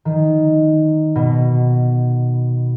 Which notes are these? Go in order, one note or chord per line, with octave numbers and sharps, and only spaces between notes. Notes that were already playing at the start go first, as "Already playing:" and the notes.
D#3
B2